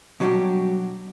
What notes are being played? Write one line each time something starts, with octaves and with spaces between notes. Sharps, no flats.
B2 F#3 G3 D4 F#4 G4